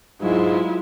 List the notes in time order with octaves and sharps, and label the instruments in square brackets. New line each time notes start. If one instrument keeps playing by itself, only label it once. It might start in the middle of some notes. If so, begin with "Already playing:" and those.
[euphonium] G#2 [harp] F#3 [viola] G#3 E4 [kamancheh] F4